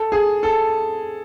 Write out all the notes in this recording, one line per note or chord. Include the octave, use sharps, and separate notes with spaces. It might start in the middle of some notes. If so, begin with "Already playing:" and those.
Already playing: A4
G#4
A4